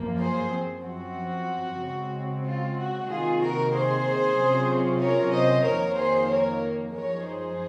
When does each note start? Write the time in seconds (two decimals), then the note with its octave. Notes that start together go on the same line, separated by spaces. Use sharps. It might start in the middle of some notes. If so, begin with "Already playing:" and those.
Already playing: F#2 F3 A#3
0.19 G#4 C5
0.52 F#2 F3 C4
0.85 F#4
1.80 C#3 G#3 C4
2.44 F4
2.77 F#4
3.08 C3 D#3 A#3 F4 G#4
3.41 F#4 A#4
3.72 G#4 C5
4.37 C3 F#3 C#4 F4
5.02 A#4 C#5
5.34 C5 D#5
5.65 F2 D#3 A#3 A#4 C#5
5.97 G#4 C5
6.30 A#4 C#5
6.94 F#2 F3 G#3 D#4 A#4 C#5
7.26 G#4 C5